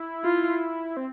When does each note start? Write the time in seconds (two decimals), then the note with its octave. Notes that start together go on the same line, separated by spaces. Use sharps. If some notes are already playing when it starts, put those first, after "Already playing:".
Already playing: E4
0.24 F4
0.97 C4